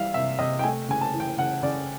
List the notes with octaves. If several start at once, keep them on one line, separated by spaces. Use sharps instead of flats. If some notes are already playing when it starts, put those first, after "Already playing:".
Already playing: E3 G3 E5 F5
C3 E5
C3 D#5
G5
A3 G#5
C#3 G#5
A5
E3
G5
C#3 F#5
C#3 D5